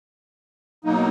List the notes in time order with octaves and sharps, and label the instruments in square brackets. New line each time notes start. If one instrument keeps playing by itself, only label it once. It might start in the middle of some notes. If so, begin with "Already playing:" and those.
[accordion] B2 F#3 A#3 D#4